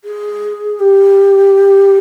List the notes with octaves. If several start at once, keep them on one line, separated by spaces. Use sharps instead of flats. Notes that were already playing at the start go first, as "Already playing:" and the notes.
G#4
G4